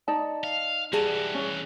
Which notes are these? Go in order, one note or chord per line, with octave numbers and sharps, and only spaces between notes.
D#4 D5 A5
F5
E3 G3 F#4 G#4 A5
C#4